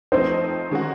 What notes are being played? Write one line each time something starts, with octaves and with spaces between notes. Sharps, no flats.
F3 A3 C4 D#4 C5
D#3 G#3 C#4 F#4